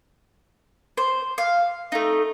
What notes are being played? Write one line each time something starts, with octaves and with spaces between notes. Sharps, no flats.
C5
F5
A3 D#4